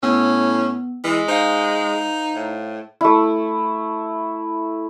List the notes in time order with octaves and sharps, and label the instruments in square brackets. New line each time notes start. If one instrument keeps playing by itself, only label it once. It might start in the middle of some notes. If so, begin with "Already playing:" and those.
[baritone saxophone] A2 [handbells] B3 [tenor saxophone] C#4
[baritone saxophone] E3 [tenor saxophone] G#3
[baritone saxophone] D#4 [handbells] C5 F5
[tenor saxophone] A2
[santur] A3 E4